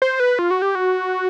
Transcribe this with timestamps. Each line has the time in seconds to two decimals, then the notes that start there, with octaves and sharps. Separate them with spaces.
0.02 C5
0.20 B4
0.39 F4
0.51 F#4
0.62 G4
0.75 F#4